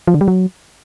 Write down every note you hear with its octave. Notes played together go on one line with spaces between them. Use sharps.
F3
D3
G3
F#3